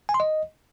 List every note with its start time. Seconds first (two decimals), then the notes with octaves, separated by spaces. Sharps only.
0.09 G#5
0.14 C6
0.20 D#5